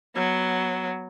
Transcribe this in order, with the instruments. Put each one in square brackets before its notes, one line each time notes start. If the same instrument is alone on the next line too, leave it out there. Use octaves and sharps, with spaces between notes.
[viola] F#3 B3